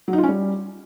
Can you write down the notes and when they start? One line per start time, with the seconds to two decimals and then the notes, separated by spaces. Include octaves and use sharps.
0.08 F#3
0.13 D#4
0.18 F4
0.23 C#4
0.29 G3